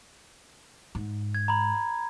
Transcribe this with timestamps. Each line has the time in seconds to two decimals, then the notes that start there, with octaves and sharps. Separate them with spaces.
0.95 G#2
1.35 G#6
1.48 A#5 B5